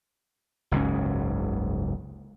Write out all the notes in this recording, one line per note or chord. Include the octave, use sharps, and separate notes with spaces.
F#1 C#2 G#2 C#4